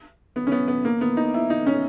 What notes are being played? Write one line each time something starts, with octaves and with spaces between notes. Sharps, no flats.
B3
C#4
B3
B3
A#3
B3
D#4
E4
D#4
C#4